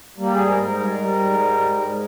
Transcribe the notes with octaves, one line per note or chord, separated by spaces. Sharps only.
G3 A#3
G4
G#2 G#4
A#4
G#2
A#4
G3
G3
G#2
G3
G#2
G#2